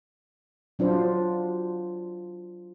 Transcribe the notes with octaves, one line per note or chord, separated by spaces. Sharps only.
F#3 D4 F4 C5